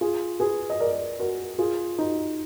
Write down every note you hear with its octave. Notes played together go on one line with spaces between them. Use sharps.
F4 G#4
G#4 B4
D#5
A#4 D5
F#4 A#4
F4 G#4
D#4 F#4